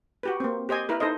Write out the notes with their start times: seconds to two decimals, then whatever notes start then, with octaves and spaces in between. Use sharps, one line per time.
0.23 F#4 G4 B4
0.40 A#3 C4
0.69 G4 C5 D#5 G#5
0.89 E4 A#4 B4
1.00 D#4 A4 C5 D#5